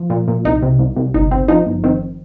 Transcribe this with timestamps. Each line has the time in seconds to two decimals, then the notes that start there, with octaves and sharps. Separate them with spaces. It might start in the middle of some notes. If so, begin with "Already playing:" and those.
Already playing: F3 F4
0.10 A#2
0.28 A#2
0.45 C2 D#4
0.62 C3
0.79 C2
0.96 C2
1.14 G1 D#4
1.31 G1 C4
1.48 F3 D#4
1.66 G1
1.84 D#3 C4